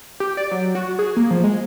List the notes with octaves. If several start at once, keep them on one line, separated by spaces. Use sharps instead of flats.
G4
D5
F#3
F#4
G#4
A#3
F3
G#3